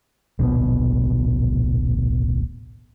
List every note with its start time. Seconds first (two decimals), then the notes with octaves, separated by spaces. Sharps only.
0.39 D1 A#1 B2 B3